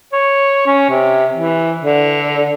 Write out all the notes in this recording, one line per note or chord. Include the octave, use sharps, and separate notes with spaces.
C#5
C#4
C3
E3
D3